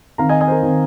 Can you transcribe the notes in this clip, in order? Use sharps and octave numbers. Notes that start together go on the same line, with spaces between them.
D#3 C4 F5 A#5
D#5 G#5
D#5 G#5
C5
A#4
D#3 C4